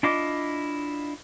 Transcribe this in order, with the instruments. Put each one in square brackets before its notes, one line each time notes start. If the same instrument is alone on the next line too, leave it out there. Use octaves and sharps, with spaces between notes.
[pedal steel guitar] D4 E4 F4 D#5 D6